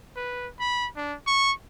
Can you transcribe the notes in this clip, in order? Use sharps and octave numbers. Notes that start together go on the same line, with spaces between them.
B4
B5
D4
C#6